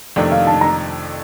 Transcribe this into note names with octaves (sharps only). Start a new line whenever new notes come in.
F2 C3 D#3 A3 D4
F5
A5
A#5